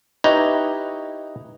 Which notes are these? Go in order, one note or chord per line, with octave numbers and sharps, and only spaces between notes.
D#4 E4 G4 B4 C#5 D#5